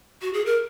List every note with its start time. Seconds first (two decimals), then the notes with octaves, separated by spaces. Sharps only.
0.22 F#4
0.33 G#4
0.46 A#4